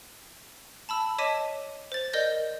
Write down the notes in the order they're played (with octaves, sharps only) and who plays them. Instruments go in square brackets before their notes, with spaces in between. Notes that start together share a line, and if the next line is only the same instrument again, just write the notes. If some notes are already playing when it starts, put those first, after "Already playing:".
[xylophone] A5 B5 E6
C#5 D#5 A5 D6 B6 D#7
C5 A6
A#4 D5 D#5 G6 A#6